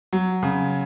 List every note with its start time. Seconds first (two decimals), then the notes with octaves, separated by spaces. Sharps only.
0.13 F#3
0.43 C#3